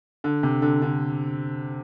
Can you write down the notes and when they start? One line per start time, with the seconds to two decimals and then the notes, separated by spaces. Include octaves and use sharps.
0.24 D3
0.43 C3
0.62 D3
0.82 D3